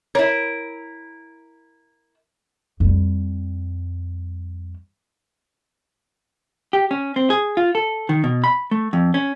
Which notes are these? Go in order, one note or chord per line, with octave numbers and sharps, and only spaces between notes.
E4 A#4 C#5
F2 G3
G4
C#4
C4
G#4
F4
A4
D#3
B2
B5
A3
F2
C#4